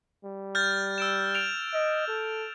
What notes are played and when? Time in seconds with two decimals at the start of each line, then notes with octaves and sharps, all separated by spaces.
0.25 G3
0.55 F6 G6 A6
0.98 E6 D7 E7
1.35 D7 F7
1.73 D#5
2.07 A4